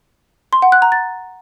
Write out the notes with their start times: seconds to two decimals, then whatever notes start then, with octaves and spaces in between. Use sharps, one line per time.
0.53 C6
0.62 F#5
0.72 F#6
0.82 A#5
0.92 A6